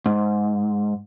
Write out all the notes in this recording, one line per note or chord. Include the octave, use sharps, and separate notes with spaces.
G#2